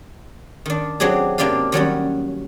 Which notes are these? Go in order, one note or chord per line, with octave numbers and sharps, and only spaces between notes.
D#3 D4
F#3 C4 D4 G4 G#4
C3 A#3 D4 F4 G4 F5
D#3 F#3 G3 C#4